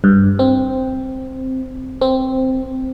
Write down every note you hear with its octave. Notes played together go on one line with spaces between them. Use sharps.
G2
C4
C4